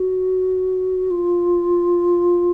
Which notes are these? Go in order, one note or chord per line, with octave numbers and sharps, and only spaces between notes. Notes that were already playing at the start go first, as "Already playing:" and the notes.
Already playing: F#4
F4